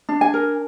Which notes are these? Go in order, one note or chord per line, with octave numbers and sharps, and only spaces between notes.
D4
G#5
A#4